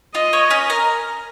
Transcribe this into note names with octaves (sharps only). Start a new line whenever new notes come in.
F4 D#5
C#5
C#4
A#4